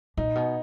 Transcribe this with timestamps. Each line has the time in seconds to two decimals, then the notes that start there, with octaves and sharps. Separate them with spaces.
0.17 A#2 D#4
0.35 B2